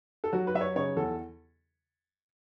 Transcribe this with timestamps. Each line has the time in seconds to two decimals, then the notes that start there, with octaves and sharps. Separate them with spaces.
0.24 A4
0.33 F#3 F#4
0.47 B4
0.55 F#3 E5
0.61 C#5
0.76 C#3 C#5
0.96 E2 A4